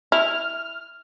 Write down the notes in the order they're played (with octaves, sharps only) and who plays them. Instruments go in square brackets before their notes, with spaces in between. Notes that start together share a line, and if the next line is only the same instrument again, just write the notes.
[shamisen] E4 [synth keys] F6